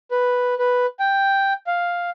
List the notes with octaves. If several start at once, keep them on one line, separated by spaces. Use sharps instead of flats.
B4
B4
G5
F5